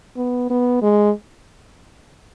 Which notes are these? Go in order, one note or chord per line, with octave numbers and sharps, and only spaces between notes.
B3
B3
G#3